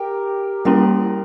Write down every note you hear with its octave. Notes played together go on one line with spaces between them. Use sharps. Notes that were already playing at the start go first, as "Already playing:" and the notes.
Already playing: G4 A#4
G3 A#3 C#4 E4 G4 A#4